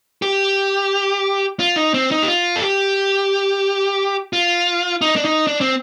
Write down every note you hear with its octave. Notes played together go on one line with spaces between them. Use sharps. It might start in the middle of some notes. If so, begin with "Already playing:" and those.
G4
F4
D#4
C4
D#4
G4
F4
A4
G4
F4
D#4
D4
D#4
D4
C4